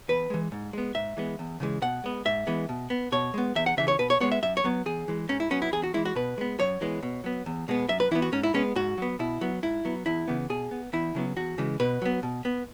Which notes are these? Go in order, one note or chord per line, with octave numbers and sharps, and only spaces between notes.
E2 B4
E3 G#3
G#2
G#3 B3
G#2 E5
E3 G#3 B3
E2
C#3 E3 G#3
B2 F#5
G#3 B3
G#2 E5
E3 G#3 B3
B2
B3
B2 C#5
G#3 B3
E2 E5
F#5
C#3 E3 E5
C#5
B2 B4
C#5
G#3 B3 C#5
E5
F#2 E5
C#5
F#3 B3
E2 G#4
E3 G#3
G#2 C#4
E4
F#3 B3 C#4
E4
E2 G#4
F#4
E3 G#3 E4
F#4
B2 B4
G#3 B3
F#2 C#5
E3 G#3 B3
B2
F#3 B3
E2
B2 G#3 B3
F#2 E5
B4
E3 B3 E4
F#4
G#2 C#4
E4
G#3 B3 C#4
G#2 F#4
F#3 B3
B2 E4
F#3 B3
G#2 E4
F#3 B3
E2 E4
C#3 E3 B3
B2 G#4
B3
E2 E4
C#3 F#3 B3
E2 F#4
C#3 E3 G#3
B2 B4
F#3 B3
B2
B3